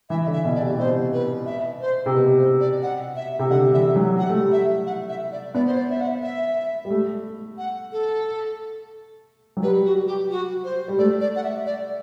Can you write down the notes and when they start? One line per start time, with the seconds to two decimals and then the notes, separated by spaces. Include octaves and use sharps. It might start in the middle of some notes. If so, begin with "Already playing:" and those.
0.10 E3 E5
0.27 D3
0.33 E5
0.44 B2
0.55 D5
0.61 C3
0.73 C3
0.78 B2 C5
1.13 B4
1.46 E5
1.81 C5
2.06 C3
2.14 B2 B4
2.37 C5
2.60 D5
2.83 F#5
3.16 E5
3.39 C3
3.50 D3 F#5
3.73 E3 E5
3.96 F#3
4.18 G3 F#5
4.29 A3
4.41 G3
4.52 E5
4.86 F#5
5.09 E5
5.32 D5
5.54 B3 D5
5.67 C5
5.77 D5
5.90 E5
6.00 F#5
6.23 E5
6.85 G3
6.90 A3
7.58 F#5
7.92 A4
9.57 F#3
9.63 G3 B4
9.85 F#4
10.07 G4
10.31 F#4
10.64 C5
10.88 G3
10.98 A3 D5
11.21 D5
11.36 F#5
11.44 E5
11.66 D5